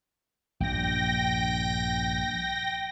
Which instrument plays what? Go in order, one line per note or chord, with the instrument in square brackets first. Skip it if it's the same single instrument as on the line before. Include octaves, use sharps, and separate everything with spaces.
[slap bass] A#1 G2 [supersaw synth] G5 A#6